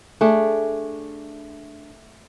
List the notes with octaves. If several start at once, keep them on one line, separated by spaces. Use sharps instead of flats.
A3 D4 G#4